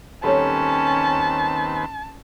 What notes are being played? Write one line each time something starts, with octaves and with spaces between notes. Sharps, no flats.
D#2 G3 C4 C#4 A4 B4 C#5 A5